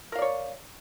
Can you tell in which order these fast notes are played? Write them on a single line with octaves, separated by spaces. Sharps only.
A#4 F5 D5 C#5